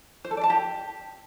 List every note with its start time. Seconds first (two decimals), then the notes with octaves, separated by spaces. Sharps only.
0.24 C5
0.31 A4
0.37 D5
0.43 A5
0.50 G4